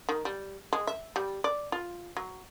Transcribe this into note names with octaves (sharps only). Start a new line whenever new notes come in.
D#3
G3
G#3
E5
G3
D5
F4
F#3